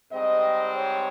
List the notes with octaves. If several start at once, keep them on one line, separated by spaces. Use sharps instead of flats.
G#2 G3 C4 D#5
C#5